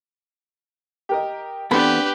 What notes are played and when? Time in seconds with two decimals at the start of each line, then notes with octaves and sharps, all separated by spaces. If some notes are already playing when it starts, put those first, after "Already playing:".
1.09 G4 A#4 D#5
1.71 E2 B3 C4 D4 G4 A4 B4 B5